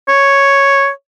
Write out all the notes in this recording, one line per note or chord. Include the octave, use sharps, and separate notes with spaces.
C#5